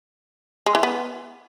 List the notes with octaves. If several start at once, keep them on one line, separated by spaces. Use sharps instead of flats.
G#3
E3
B3